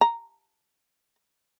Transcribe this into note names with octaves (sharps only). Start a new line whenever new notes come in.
A#5